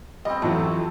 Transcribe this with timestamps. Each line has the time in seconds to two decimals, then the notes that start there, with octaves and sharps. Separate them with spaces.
0.25 G3 C4 D#5
0.42 F2 E3 F#3 A3